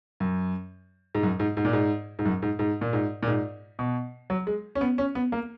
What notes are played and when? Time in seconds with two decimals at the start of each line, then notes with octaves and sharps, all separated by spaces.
0.20 F#2
1.15 G#2
1.23 F#2
1.40 G#2
1.57 G#2
1.65 A#2
1.73 G#2
2.19 G#2
2.25 F#2
2.42 G#2
2.59 G#2
2.81 A#2
2.93 G#2
3.23 A#2
3.27 G#2
3.79 B2
4.30 F#3
4.47 G#3
4.75 C#4
4.81 B3
4.98 C#4
5.15 B3
5.32 A#3